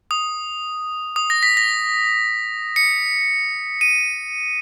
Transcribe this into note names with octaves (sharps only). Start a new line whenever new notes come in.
D#6
D#6
A#6
B6
A#6
C#7
D#7